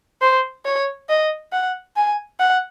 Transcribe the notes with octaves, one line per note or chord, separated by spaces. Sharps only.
C5
C#5
D#5
F#5
G#5
F#5